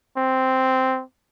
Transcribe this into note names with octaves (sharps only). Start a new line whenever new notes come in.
C4